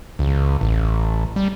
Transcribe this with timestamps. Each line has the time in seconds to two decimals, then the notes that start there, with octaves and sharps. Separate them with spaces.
0.19 C#2
0.61 A1
1.36 G3